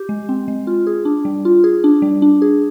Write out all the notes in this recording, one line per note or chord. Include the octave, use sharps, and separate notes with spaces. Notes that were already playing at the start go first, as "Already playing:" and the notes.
Already playing: G4
G#3
C4
G#3
F4
G#4
D4
G3
F4
G#4
D4
G3
D4
G#4